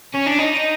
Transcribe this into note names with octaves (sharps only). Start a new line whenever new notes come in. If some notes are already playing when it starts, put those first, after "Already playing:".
C#4
D4
D#4